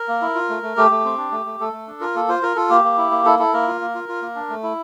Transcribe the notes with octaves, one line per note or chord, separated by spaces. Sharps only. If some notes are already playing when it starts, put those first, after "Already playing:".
Already playing: A#4
A#3
E4
F4
A3
A3
A3 G4
A3
C4
D4
A3
A3
A3 A4
A3
D4
F4 A#4
A#3 A4
F4 C5
F4 A#4
F4 A4
A#3 G4
A#3
E4
A#3
E4 A4
E4 A4
A#3 A#4
F4
A#3
F4
F4
A#3
D4
A3
E4